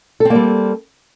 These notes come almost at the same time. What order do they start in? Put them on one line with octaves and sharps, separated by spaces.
A4 C4 A#3 G3